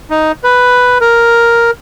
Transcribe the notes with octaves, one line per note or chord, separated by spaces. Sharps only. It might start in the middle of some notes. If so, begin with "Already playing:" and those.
D#4
B4
A#4